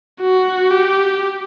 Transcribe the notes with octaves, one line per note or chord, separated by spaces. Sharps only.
F#4
G4